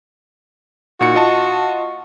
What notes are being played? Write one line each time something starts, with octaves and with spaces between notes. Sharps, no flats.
A#2 D#4 F#4 C#7
F4 D#5 A5